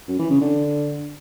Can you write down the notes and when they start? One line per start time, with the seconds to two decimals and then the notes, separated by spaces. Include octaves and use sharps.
0.08 F#2
0.19 E3
0.30 C#3
0.41 D3